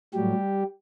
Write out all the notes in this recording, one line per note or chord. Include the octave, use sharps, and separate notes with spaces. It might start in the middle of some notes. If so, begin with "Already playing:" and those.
A2 F#3 G3 G4